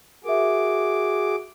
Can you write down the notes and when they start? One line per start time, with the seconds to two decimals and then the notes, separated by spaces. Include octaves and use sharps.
0.24 F#4 G#4 A#4 E5 D6